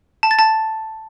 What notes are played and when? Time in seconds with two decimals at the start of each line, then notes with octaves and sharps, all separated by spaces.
0.23 A5
0.31 A6
0.39 A5